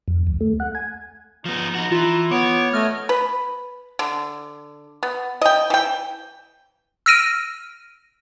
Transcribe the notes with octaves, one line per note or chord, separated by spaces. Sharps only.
F2
D2
A3
F#5
G#5
F3 B3 D#4
D#4 F#4 A#5
E3 F4
B3 C#5 D6
A3 D#5 F6
B4
D3
B3
D#5 G5
E3 G5
E6 F6 A#6 D7 D#7